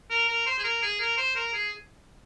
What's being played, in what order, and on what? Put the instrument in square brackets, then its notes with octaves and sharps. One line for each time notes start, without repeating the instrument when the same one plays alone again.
[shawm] A#4
A#4
C5
G#4
A#4
G#4
A#4
C5
A#4
G#4